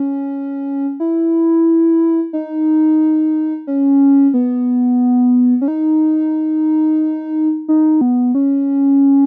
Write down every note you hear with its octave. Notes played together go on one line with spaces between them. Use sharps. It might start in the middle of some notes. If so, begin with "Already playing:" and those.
Already playing: C#4
E4
D#4
C#4
B3
C#4
D#4
D#4
B3
C#4